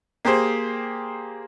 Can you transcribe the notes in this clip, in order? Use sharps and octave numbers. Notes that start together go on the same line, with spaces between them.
A#3 G4 G#4 C5